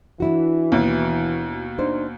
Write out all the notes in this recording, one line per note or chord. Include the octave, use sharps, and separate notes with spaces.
E3 D4 E4 F#4
D#2 B2
D4 D#4 C5